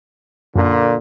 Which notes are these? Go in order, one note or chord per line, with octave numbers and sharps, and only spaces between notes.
F#2 A#2 D3